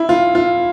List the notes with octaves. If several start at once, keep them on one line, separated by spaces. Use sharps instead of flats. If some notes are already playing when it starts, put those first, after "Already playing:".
Already playing: E4
F4
F4